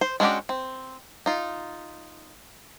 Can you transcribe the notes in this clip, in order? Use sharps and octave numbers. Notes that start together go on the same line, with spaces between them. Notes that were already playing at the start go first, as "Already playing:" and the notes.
C5
G#3 C#4 D4 F#4 G4
C4
D#4 F4